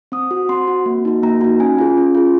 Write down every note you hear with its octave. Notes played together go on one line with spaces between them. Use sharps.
C4 D#6
F#4
C4 C6
F#4
A#3
D#4 F#4
A#3 A#5
D#4 F#4
C#4 G#5
F4 G#4
C#4
F4 G#4